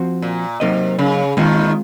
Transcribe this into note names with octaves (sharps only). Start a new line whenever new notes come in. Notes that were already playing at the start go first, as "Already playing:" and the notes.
Already playing: F3 C4 F#4 C5
A#2
C3 F#3 A#3 D#4 A#4 D#5
C#3
D#2 D#3 G#3 C4 F4